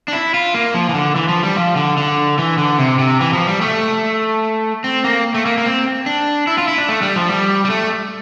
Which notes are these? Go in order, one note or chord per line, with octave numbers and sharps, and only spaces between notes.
D4
E4
F4
A#3
F3
E3
D3
E3
F3
G3
F3
D3
D3
E3
D3
C3
C3
E3
F3
G3
A3
C4
A#3
A3
A#3
A#3
C4
D4
E4
F4
E4
D4
A3
G3
F3
G3
G3
A3